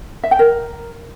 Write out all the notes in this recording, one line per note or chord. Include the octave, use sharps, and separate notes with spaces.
E5
G5
A#4